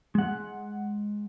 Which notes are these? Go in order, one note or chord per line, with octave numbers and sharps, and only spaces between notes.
G#3 F#5